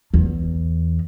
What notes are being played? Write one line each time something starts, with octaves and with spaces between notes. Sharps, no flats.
E2